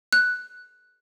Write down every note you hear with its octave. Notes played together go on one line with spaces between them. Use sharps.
F#6